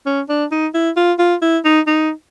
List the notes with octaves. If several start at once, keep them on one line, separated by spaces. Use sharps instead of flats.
C#4
D4
D#4
E4
F4
F4
E4
D#4
D#4